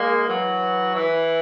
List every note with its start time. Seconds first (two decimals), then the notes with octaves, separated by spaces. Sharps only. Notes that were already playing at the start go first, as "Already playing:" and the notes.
Already playing: G#3 A#3
0.27 E3 F#3
0.95 E3